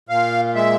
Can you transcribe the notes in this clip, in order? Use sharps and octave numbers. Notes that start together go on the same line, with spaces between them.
A#2 F5
G#3 E5